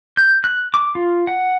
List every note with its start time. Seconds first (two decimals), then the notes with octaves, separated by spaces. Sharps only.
0.17 G6
0.44 F#6
0.74 D6
0.95 F4
1.27 F#5